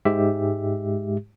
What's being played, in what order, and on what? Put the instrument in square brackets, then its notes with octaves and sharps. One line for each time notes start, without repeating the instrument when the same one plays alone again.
[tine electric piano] G#2 G#3 G4 E5